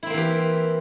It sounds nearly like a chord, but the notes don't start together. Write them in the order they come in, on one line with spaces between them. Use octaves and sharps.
E4 C4 A#3 E3 G4